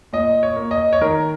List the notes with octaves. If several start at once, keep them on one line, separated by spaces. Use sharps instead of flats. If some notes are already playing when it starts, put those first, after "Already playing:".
A#2 D#5
C#5
A#3
D#5
C#5
D#3 A#4